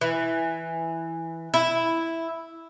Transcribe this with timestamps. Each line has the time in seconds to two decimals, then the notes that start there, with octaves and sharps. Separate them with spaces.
0.01 E3
1.54 E4